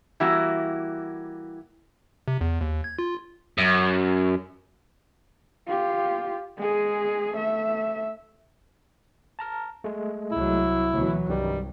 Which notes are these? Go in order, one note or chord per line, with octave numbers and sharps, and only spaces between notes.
E3 G3 A#3 E4 F#4
C3
E2
D#2
G#6
F4
F#2
F4 G4
G#3 G#4
A3 E5
A5 A#5 F6
G#3 A3
C2 F#3 E4
D2 B2 E3 F#3
C2 G2 D#3 G3 D#4